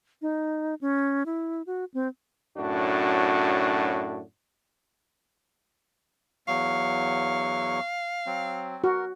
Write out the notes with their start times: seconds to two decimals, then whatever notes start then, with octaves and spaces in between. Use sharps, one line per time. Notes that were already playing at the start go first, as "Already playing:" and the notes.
0.22 D#4
0.81 C#4
1.26 E4
1.67 F#4
1.94 C4
2.56 F#2 A2 D4 F#4
6.48 E2 F#3 F5 C#6
8.26 F#3 C4
8.84 F#4 A#4